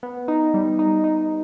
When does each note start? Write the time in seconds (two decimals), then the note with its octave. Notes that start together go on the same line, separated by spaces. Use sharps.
0.03 B3
0.28 D#4
0.54 G3
0.79 D#4
1.04 D#4